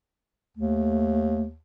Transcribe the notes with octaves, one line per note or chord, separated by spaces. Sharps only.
D#2 A3